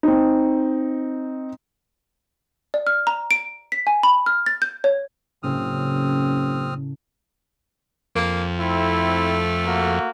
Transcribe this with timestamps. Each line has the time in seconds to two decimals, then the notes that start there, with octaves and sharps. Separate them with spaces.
0.03 C4 D#4
2.74 D5
2.87 F6
3.07 A#5
3.31 D7
3.72 B6
3.87 G#5
4.03 B5
4.26 F6
4.46 A6
4.62 G6
4.84 C#5
5.43 F#1 A2 C#3 C4 D#6 F6
8.15 F2 A#3
8.60 A3 C4 E4
9.66 A#3 F#4